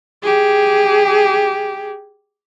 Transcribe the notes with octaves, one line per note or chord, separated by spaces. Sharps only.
G4 G#4